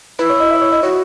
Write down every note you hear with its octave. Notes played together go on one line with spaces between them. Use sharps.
E4 B4
C#5
D#5
E5
C#5
D#5
F#4 C#5